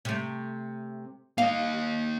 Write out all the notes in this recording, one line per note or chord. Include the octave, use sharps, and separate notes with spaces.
C3 A3
A#3 D#5 F5